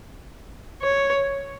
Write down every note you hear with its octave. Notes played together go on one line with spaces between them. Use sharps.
C#5